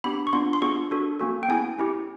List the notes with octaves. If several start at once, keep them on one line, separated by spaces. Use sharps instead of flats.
B3 D4 G4 B5
C#6
B3 D4 F4 C6
C6
B3 D4 F4 G#4 C#6
D4 F#4 A4
A#3 C#4 F#4 A4
G5
B3 E4 G#4 G#5
C#4 E4 G4